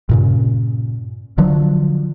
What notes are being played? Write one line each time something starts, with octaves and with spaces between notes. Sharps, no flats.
G2 A#2 C#3
D3 F3 F#3